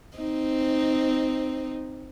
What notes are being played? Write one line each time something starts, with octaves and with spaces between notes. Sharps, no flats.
C4 D#4